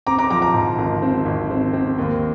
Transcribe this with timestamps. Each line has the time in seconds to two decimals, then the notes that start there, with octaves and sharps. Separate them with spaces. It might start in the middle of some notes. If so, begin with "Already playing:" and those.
0.07 C4 A#5 D6
0.19 A#5 D6
0.31 F3 A#5 D6
0.42 A#5 D6
0.54 G#2
0.78 G#1
1.02 C4
1.26 G#1
1.51 C4
1.73 C4
1.98 D#2